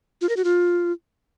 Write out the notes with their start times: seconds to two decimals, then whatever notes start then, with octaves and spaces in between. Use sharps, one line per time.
0.21 F4
0.29 A#4
0.37 F#4
0.44 F4